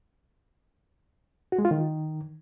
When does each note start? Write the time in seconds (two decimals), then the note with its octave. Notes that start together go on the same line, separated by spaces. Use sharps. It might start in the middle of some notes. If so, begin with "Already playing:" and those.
1.52 F#4
1.59 G#3
1.65 F4
1.71 D#3